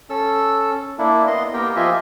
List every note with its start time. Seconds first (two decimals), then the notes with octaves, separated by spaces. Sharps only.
0.10 C#4 A4 E6
0.99 A#3 D4 E4
1.27 B3 D#5 C6
1.54 A#3 B3 G4 A#4 G5
1.76 F3 F4 G4 D#5 E5 G#5